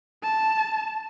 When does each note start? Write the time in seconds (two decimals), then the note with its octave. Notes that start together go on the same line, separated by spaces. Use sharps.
0.23 A5